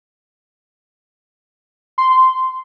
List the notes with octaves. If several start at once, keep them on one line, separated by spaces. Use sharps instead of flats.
C6